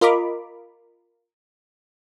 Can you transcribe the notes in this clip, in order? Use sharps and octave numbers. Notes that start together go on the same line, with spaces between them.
F4 A#4 D#5 B5 D6